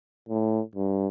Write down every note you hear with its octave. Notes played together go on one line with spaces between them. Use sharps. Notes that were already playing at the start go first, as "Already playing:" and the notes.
A2
G2